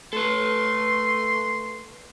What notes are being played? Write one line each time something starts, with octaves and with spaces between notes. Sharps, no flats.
A3 A4 B4 C6